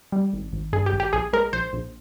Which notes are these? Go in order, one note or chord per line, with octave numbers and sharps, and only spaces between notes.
G3
G#1
G#1
G2 G#4
G4
G#1
G4
A#1 G#4
G#3 A#4
A#1 C5
A#1